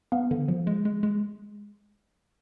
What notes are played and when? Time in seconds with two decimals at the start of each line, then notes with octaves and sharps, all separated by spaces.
0.12 B3 F5
0.31 D3
0.48 F3
0.67 G#3
0.85 G#3
1.03 G#3